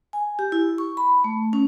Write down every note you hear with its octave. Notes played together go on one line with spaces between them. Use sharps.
G#5
G4
E4
C#6
B5
A3
C#4